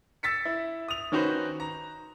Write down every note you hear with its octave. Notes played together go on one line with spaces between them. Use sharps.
E6 A6 B6 C#7
E4
D#6 F7
D#3 C#4 D#4 F#4 B4 C5
A#5